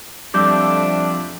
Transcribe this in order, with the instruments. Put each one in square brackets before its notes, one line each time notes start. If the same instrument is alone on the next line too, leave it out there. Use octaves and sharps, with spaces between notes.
[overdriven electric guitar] F2 [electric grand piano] G3 E6 [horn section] A3 D4 [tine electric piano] D6 G6